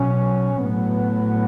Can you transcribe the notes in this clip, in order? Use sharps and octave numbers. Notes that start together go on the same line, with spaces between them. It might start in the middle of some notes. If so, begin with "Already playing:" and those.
Already playing: B2 F#3 C#4
A2 F#3 B3